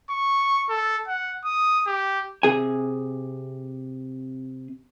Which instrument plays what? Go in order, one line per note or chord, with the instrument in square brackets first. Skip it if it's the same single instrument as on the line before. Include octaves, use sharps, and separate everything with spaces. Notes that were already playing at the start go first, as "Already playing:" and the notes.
[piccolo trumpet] C#6
A4
F#5
D#6
G4
[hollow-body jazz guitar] C3 G#4 G#5